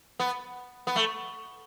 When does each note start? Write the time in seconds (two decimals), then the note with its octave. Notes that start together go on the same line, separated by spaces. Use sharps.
0.20 B3
0.87 B3
0.96 A3